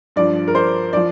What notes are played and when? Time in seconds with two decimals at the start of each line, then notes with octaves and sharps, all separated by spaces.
0.16 G2 F3 D5
0.47 A#4
0.55 C5
0.93 F3 D5